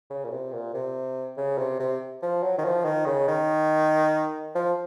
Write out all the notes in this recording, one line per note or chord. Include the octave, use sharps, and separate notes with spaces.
C#3
A#2
C3
A#2
C3
C#3
C3
C3
F3
F#3
D#3
F3
D#3
C#3
D#3
F3